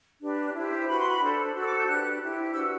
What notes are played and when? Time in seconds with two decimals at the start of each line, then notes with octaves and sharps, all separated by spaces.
0.21 D4 G4 B4
0.55 E4 G4 C5
0.87 F#4 B4 B5
0.99 C6
1.11 B5
1.21 D4 A4 C5
1.54 F#4 A4 C5
1.61 E6
1.66 D6
1.78 G6
1.88 D4 G4 B4 F#6
2.22 E4 G4 C5
2.55 D4 F#4 B4 E6